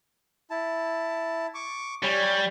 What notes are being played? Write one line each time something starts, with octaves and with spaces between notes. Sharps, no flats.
E4 A5
C#6 D6
G3 C#5 G#5